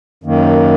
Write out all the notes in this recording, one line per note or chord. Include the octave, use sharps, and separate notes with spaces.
F#2 D#3 A#3